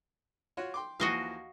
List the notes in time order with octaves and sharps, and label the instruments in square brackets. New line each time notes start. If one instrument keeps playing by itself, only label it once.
[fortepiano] F4 F#4 C#5
G5 C6 D6
[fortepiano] D#2 E3 F3 [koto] F#4 D#5 F5